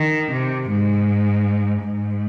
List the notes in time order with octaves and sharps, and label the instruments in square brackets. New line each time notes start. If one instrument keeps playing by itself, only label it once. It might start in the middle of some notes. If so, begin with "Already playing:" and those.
Already playing: [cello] D#3
C3
G#2
G#2